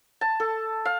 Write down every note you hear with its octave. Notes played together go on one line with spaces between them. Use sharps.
A5
A4
F5